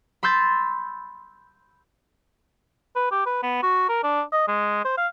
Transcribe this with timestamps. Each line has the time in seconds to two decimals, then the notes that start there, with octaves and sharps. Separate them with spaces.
0.23 B5 C6 E6 G6 A6
2.96 B4
3.11 G4
3.26 B4
3.43 B3
3.63 F#4
3.89 A#4
4.03 D4
4.33 D#5
4.48 G#3
4.85 C5
4.97 F5